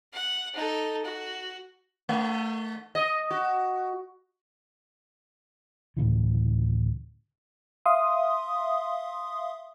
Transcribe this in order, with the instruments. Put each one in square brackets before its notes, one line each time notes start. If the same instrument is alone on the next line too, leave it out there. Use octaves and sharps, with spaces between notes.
[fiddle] F#5
D#4 A4
F#4
[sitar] A3
D#5
F#4
[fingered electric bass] D2 A2 C#3 E3
[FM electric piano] E5 F5 C6 D#6